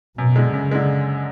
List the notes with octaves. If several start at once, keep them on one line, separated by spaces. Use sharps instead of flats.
F#2 B2
D3 G#3
F#2 C#3
D3 G#3